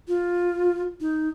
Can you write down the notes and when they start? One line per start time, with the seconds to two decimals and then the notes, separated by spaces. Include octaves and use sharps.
0.08 F4
1.00 D#4